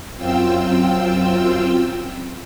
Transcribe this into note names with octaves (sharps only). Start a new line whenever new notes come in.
F#2 C4 F4 G5 E6